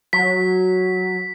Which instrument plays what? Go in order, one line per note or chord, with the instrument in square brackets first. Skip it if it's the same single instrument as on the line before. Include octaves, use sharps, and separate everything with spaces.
[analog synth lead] F#3 [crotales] B6